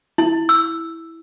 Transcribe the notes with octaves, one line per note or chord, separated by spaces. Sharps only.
E4
E6